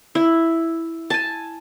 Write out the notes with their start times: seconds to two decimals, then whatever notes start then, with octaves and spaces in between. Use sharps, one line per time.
0.15 E4
1.10 G#5 A5